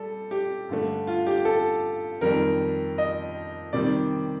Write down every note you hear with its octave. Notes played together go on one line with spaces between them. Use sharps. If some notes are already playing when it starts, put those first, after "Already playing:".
Already playing: G3 A4
G4
G2 D3 A3
F4
G4
A4
F2 D#3 G3 A#4
D#5
C3 D#3 G3 D5